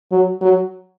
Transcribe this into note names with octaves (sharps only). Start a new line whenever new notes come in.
F#3
F#3